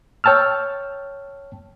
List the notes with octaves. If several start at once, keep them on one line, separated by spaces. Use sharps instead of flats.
C#5 G5 A5 E6 F6